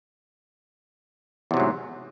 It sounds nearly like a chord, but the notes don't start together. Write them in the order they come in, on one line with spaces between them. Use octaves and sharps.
E2 C3 F#3 G#2